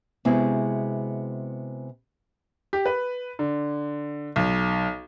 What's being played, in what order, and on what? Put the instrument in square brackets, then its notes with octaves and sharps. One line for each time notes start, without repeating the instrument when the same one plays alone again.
[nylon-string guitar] C3 G#3 B3 E4 F#4 G#4
[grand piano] G4
B4
D3
B1